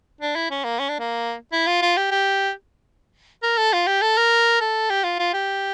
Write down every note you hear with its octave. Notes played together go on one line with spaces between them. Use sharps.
D4
E4
C#4
A#3
C#4
D4
A#3
E4
F4
F4
G4
G4
A#4
A4
F4
G4
A4
A#4
A4
G4
F4
F4
G4